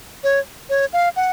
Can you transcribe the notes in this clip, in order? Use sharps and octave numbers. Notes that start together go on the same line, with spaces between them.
C#5
C#5
F5
F#5